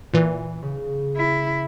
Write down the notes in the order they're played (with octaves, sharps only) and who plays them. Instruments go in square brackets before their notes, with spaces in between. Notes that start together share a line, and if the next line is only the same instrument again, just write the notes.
[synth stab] A#2 E3
[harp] C#3
[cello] E4